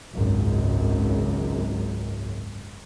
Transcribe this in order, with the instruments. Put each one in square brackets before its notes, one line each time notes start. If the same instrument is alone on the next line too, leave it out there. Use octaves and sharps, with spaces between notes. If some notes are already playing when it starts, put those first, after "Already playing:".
[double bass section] G#1 C#2 F#2